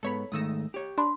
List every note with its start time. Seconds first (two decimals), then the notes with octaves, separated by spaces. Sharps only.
0.03 G#2 B3 A4 C#5 B5
0.32 G#2 D#3 A3 D#6 E6 A#6
0.74 G4 C#5
0.98 D4 B5 C6